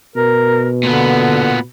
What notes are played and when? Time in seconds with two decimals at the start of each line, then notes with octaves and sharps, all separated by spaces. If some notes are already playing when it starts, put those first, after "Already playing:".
0.16 B2 A#4
0.84 A#2 D3 B3